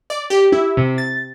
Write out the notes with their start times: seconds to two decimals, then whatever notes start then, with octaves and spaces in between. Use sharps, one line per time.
0.10 D5
0.30 G4
0.52 E4
0.77 C3
0.98 A6